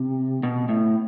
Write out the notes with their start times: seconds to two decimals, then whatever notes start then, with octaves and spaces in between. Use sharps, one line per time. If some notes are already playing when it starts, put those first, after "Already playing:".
Already playing: C3
0.43 B2
0.69 A2